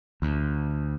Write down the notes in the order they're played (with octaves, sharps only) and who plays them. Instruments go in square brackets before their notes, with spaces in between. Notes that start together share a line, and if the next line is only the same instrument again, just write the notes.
[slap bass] D2